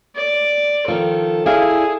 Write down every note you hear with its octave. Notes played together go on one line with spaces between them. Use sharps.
D5
D#3 F3 A4
E4 G#4 D5 F5